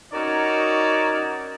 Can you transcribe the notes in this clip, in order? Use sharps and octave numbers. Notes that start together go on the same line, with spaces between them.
C#4 D#4 F#4 A#4 C#5 D5